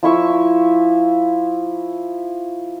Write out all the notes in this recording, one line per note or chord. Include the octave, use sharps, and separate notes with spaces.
F3 E4 C#6 E6